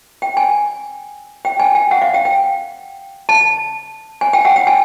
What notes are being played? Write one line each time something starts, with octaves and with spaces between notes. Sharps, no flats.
G5
G#5
G5
G#5
G5
F#5
F5
G5
G5
A5
G#5
G5
F#5
G5
G#5